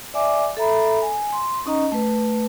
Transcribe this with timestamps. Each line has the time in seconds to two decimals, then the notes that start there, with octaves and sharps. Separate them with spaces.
0.14 D5 E5 G#5 D6
0.57 A4 E5 A#5 B5
1.02 G#5
1.32 C6
1.66 C#4 D#4 D#5 A#5
1.92 A3 B4